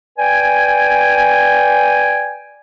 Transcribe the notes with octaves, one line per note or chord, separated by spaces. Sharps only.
B4 D5 G5 G#5